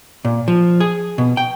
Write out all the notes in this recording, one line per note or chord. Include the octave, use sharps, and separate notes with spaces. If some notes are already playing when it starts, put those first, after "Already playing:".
A#2
F3
G#4
B2
G5